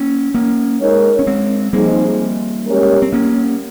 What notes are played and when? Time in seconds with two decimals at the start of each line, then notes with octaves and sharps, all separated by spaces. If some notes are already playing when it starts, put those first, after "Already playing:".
Already playing: A#3 C#4
0.34 A#3 C#4
0.81 G#3 D#4 A#4 C#5
1.19 C#4
1.27 G#3 C4
1.73 F3 G3 A#3 C4 D#4 G#4
2.66 G#3 C#4 G4 A#4 C#5
3.02 C4
3.13 A#3 C#4